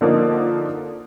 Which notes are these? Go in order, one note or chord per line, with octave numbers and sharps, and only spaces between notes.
D3 F3 A#3 D#4